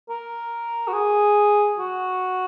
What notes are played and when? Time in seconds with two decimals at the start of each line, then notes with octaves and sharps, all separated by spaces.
0.09 A#4
0.88 F#4
0.93 G#4
1.78 F#4